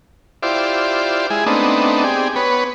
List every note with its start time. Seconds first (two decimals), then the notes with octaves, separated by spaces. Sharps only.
0.43 E4 F4 G4 C5 D5
1.30 G#3 E4 G#4
1.46 A3 B3 C4 D4 D#4
2.04 C4 G4 G#4 D5
2.36 B3 B4 C#5